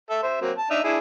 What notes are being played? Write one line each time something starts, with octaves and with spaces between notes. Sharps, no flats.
A4 E5
C5 E5
F#3 A#3 C4
A5
D4 D#4 E5
D4 E4 G#4